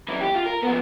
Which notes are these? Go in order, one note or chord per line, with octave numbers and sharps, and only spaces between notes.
F#2 E3
G4
F4
A#4
F3 B3